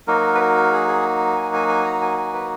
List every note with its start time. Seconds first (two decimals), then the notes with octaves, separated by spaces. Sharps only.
0.07 F#3 A#3 D#4 F#4 A#4
0.35 B4
0.40 A#4
0.72 G#4
0.88 G#4
1.36 G#5
1.53 G#5
1.69 G#5
1.85 A#5
2.01 G#5
2.17 G#5
2.33 B4